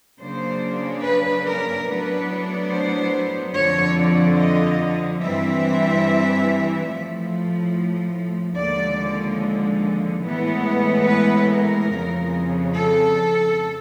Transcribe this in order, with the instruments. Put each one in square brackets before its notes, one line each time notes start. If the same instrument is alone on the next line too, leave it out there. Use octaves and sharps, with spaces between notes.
[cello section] C#3 F#3 A#3 D4 C5
B4
A#4
A2 F#3 B3 D4 B4
C5
F2 D3 F3 C#5
D5
D#5
G2 E3 G3 C4 E5
A2 F3 A3
D#2 D3 F3 G#3 D5
A2 E3 G#3 B3
B4
A#4
F2 C#3 F3
A4